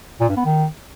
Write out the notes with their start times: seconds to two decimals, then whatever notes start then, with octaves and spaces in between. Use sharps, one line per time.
0.20 A#2
0.28 G2
0.37 B3
0.45 D#3